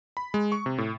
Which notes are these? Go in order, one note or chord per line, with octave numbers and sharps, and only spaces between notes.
B5
G#3
C#6
C3
A2